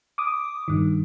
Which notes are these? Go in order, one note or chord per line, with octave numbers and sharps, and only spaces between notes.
D6 D#6
G2 D#3